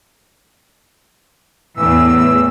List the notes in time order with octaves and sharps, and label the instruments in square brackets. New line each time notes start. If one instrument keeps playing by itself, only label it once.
[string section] E2 A2 [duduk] E3 [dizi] E6